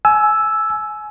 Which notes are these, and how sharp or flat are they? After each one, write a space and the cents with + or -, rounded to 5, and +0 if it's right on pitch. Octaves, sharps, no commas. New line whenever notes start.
G#5 +25 E6 +0